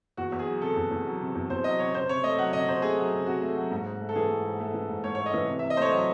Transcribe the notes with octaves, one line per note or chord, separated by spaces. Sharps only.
E2 F#4
E2
G#4
F#3
C3 A4
E2
E2
F#3
C3
E2
E2 C5
F#3 D#5
C3 C#5
C3 C5
C3 C#5
A3 D#5
F#3 F#5
C3 D#5
C3 C5
A3 G#4
F#3
C3
C3 F#4
A3
F#3
G#2
G#2
A3
A4
E3 G#4
G#2
G#2
A3
E3
G#2
G#2 C#5
C#5
A3
D#5
E3
C3
E5
C3
D#5
A3 C5 C#5
F#3 D#5